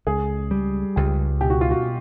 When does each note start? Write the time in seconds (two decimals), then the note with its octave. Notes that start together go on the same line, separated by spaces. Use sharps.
0.07 C#2 G#4
0.51 G3
0.96 C#2 G4
1.41 B2 G4
1.50 F#4
1.61 F4
1.71 F#4